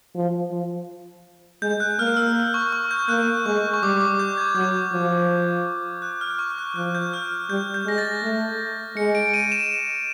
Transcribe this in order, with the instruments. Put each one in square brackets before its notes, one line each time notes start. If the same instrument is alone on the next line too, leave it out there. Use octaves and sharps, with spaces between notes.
[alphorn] F3
F3
[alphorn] G#3 [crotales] G6
[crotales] F#6
[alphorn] A#3 [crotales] F6
[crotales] E6
C#6
C#6
G6
[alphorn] A#3 [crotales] F#6
[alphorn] G#3 [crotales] C#6
[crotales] C#6
[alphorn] G3 [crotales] D6
[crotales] D6
G6
G#6
[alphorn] F#3 [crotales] G6
[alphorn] F3
[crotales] F#6
F6
C#6
F#6
[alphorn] F3 [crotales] F#6
[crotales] G6
F6
[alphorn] G3 [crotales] G6
[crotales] G6
[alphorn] G#3 [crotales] A#6
[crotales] A6
[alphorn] A3
[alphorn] G#3 [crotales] C#7
[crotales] D7
D#7
E7